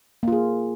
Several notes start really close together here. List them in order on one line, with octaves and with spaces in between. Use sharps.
A#3 F4 G#4